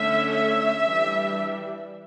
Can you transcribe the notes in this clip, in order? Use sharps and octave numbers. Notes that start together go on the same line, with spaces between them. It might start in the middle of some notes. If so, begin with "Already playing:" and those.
Already playing: D3 A3 C#4 E5
E5
E3 G3 D4